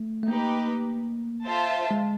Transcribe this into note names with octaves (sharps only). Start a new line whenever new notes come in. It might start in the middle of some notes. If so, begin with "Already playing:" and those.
Already playing: A3
A3
A#3 D#4 G4 B4
F4 A4 C5 E5 A5
G#3